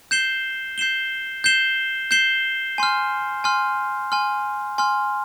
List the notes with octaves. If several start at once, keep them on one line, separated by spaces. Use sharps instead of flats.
G6 C7 E7 G7
G6 C7 E7 G7
G6 C7 E7 G7
G6 C7 E7 G7
G#5 C6 F6
G#5 C6 F6
G#5 C6 F6
G#5 C6 F6